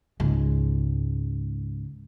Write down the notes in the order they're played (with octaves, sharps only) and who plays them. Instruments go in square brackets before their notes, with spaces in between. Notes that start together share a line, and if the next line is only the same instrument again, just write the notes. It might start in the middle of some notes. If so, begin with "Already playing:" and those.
[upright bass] C#2 G#2